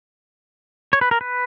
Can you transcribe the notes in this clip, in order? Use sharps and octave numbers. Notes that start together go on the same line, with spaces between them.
C#5
B4
A#4
B4